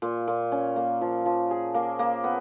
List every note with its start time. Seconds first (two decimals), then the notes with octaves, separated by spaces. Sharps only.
0.02 A#2
0.28 A#2
0.52 C#4
0.76 A#3
1.01 F3
1.25 F3
1.51 G#4
1.74 A#3
1.99 A#3
2.24 B3